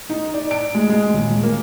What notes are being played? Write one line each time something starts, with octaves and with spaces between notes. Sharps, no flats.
D#4
D5
D7
G#3
G#3
D#1
A#3